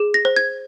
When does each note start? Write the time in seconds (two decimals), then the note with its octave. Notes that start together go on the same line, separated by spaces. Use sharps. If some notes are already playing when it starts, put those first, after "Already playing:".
Already playing: G#4
0.14 A#6
0.25 C5
0.36 G#6